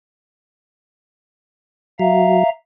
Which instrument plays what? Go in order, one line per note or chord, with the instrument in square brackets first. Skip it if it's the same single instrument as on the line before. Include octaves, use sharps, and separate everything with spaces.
[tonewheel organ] F#3 [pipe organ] E5 F5 A#5